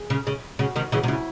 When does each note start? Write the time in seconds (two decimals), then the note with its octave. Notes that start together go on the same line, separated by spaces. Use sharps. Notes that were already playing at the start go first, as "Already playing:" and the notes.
Already playing: G#4
0.10 C#3
0.27 C#3
0.59 C#3 F#4
0.76 C3 D#3
0.92 C#3 E3 F#4
1.03 C3
1.08 C#3 E4